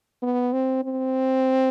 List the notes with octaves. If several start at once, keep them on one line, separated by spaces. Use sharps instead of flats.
B3
C4
C4